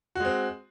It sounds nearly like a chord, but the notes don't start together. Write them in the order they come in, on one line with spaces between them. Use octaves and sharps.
F#4 G#3 C4